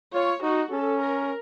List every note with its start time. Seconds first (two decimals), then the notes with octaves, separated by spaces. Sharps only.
0.14 F4 C#5
0.43 D#4 F#4
0.72 C#4 A4
1.01 A#4